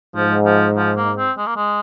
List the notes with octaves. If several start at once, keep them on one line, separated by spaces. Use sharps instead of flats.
G#2 F3
F3
F3
A#3
C4
G#3
A#3
G#3